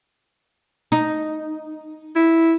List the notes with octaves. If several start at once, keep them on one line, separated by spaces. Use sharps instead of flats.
D#4
E4